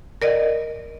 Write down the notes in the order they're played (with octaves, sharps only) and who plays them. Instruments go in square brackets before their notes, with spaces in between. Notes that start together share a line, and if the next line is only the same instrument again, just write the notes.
[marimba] A#4 D5 D#5